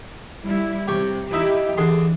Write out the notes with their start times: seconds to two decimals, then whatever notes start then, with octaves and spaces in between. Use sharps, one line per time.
0.44 G3 E4
0.88 C3 G4 C#5
1.33 D#4 E4 G4 E5
1.77 D3 E3 G#4 C6